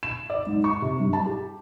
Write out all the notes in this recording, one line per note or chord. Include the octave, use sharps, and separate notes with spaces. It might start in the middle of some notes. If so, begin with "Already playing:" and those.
E7
D5
G#2
C#6
C3
G2
A5
G4